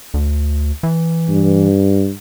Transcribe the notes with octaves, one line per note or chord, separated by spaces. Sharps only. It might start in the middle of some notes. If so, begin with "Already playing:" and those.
D2
E3
G2